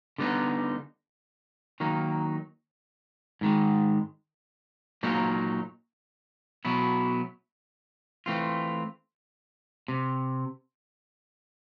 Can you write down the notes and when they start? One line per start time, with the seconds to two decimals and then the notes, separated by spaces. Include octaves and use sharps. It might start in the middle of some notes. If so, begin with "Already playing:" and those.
0.18 D3 G3 B3 D#4
1.80 D#3 F#3 A#3 D#4
3.41 G#2 D#3 G#3
5.03 A#2 F#3 A#3 D#4
6.65 B2 F#3 B3 E4
8.26 E3 A3 C4 F4
9.88 C3